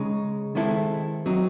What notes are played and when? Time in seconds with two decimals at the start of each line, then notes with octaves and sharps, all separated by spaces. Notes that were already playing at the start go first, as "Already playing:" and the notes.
Already playing: C#3 G#3 D#4
0.55 D#3 G#3 C4 E4 A4
1.26 F#3 C4 D#4